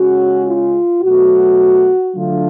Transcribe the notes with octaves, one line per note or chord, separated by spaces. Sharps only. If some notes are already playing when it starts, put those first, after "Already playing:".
Already playing: C#3 G#3 C#4 F#4
F4
B2 F#3 A3 F#4
D3 F#3 A3 D4 F4